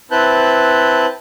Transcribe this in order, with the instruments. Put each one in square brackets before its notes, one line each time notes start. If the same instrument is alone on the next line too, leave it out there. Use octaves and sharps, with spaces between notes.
[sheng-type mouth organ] C4 E4 B4 A5 F#6 G6